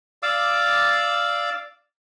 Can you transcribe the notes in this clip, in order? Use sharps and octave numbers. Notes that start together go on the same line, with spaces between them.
D5 F5 D6 E6